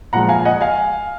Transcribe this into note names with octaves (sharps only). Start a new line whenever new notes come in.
A#2 F3 G#3 F#5 A#5
F5 G#5
G#5
D#5 F#5
F5 G#5